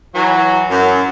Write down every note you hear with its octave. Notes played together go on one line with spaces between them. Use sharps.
E3 F#3
F#2